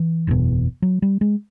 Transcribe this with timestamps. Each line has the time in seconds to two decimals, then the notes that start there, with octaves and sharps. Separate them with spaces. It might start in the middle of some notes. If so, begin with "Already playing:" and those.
Already playing: E3
0.27 F#1 E2 B2
0.82 F#3
1.02 G3
1.21 G#3